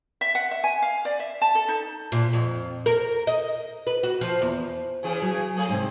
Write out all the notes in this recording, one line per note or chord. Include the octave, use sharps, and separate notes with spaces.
E5
F#5
E5
G#5
F5
D5
E5
A5
A4
D#4
A#2
F2
A#4
D#5
B4
F#4
F3
E2
C#3 E3 G#4
F#3
F#3 A3 G#4
G#2 C3 C4